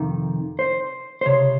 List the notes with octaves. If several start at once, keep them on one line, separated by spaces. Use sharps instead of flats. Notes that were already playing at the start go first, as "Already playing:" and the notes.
Already playing: F2 C3 D#3
C5
C5
C#2 C3 C#5